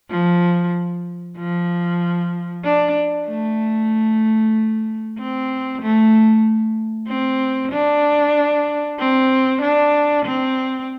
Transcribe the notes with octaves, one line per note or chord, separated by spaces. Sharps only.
F3
F3
D4
A3
C4
A3
C4
D4
C4
D4
C4